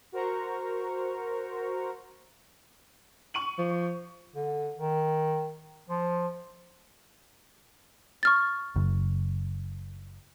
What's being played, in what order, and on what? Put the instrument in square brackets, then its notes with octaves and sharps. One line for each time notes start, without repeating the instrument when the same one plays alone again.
[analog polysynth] F#4 A#4 C5 A#5 C#6
[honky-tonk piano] C#6 D#7 F#7
[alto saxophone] F3
[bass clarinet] D3
D#3
F3
[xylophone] C#6 F6 A6
[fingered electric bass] F#1